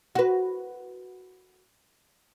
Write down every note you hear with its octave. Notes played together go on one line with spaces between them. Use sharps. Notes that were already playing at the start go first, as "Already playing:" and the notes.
F#4 B4